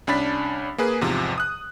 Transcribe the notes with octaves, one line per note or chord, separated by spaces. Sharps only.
C2 C#4 D4 B5 A6 B6
A#3 G#4 B4
E2 G#2 C3 F3
D#6 F#6